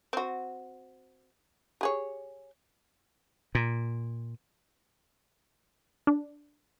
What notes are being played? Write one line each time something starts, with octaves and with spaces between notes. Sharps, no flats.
C4 F#4
G4 G#4 C#5
A#2
D4